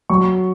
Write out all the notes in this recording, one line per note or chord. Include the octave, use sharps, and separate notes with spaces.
F#3 C#6